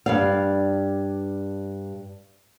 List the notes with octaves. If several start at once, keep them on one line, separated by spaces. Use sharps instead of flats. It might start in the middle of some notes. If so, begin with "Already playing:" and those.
G2 D5 F5